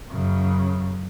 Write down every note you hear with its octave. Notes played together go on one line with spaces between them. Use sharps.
F#2 C#3